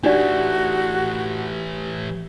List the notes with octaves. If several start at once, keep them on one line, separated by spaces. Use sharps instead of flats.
E3 A3 D4 D#4 F#4 G4 D5